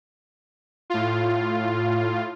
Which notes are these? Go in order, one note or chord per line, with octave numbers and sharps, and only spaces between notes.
A2 F4